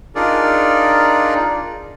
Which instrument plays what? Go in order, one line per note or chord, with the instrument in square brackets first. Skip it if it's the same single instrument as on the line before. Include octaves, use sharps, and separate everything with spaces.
[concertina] D4 D#4 F4 G#4 A#4 D5